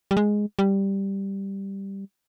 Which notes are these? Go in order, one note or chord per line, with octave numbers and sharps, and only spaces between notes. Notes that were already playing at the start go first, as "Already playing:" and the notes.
G3
G#3
G3